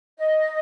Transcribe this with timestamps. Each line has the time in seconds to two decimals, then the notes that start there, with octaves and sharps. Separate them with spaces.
0.17 D#5